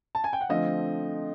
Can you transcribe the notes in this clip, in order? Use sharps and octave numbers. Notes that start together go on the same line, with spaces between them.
A5
G#5
G5
F#5
D3 F3 A3 C4 D#5 F5